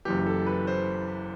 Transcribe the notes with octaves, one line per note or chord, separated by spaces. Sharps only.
F#1 F#2 E3 G4
A4
B4
C5